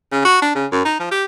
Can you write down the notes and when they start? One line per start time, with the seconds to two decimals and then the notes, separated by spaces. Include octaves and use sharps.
0.12 C#3
0.25 F#4
0.42 D4
0.55 C#3
0.72 F#2
0.85 D#4
1.00 F3
1.11 G4